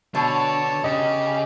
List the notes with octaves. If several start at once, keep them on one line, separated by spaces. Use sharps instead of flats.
B2 D3 C#5 A5
C#3 G4 D#5